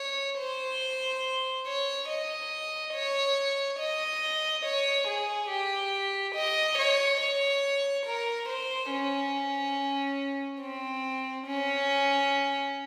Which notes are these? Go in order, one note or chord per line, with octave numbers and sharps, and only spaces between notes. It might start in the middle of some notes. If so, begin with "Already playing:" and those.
Already playing: C#5
C5
C#5
D#5
C#5
D#5
C#5
G#4
G4
D#5
C#5
C#5
A#4
C5
C#4
C4
C#4